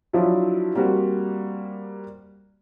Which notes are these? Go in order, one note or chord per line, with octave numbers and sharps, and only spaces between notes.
F3 F#3 D4 E4 F4
G3 A#3 C4 F#4